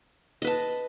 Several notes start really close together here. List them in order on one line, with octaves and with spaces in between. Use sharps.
D#5 B4 A5